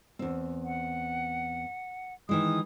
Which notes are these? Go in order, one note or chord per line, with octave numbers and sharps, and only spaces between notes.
E2 C4
F#5
D#3 E3 G#3 D#6